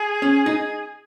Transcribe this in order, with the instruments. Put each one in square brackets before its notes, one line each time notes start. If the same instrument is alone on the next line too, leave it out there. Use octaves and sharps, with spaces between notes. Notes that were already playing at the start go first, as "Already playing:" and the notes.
Already playing: [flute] G#4
[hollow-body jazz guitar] C#4
D#4